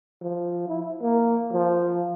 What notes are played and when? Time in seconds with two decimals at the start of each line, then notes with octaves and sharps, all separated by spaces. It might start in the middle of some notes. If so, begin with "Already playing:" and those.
0.22 F3
0.68 E4
1.02 A#3
1.52 F3